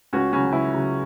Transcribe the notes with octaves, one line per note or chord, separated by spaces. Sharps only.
C#2 C#4 F#4
C#3 F#3 C#4 F#4
C#2 E4
C#3 F#3